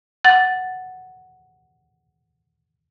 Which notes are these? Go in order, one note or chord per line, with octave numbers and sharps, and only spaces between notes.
F#5 A6